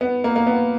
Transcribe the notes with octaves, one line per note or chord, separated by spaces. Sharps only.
B3
A#3
A#3
B3